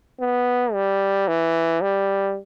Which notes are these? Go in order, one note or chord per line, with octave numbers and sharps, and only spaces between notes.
B3
G3
E3
G3